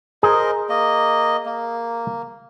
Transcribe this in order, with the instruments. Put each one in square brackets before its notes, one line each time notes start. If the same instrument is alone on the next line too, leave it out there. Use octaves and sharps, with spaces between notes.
[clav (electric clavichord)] G#4 [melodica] A#4 C5 D#5
[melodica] A#3 D#5
A#3